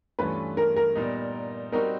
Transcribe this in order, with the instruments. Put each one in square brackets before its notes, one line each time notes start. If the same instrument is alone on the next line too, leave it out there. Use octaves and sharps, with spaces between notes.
[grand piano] G2 E3 A3 C#4 F4 [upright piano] B4
[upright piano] A#4
A#4
[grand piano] A#2 G3 B3 D#4
[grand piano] G3 C4 D#4 F#4 [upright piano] A#4